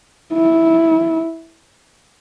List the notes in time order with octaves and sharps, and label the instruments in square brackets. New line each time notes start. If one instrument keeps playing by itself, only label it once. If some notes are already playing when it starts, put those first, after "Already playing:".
[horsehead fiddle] E4